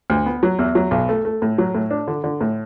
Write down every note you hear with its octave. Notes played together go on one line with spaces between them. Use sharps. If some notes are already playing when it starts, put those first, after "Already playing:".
D2
B3
F#3
E2
F#3
B1
A3
A3
A2
F#3
A2
D4
D3
D3
A2